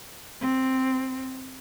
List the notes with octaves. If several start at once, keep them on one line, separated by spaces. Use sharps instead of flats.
C4